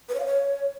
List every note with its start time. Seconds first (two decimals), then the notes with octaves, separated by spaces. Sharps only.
0.09 B4
0.14 C#5
0.20 F5
0.25 C#5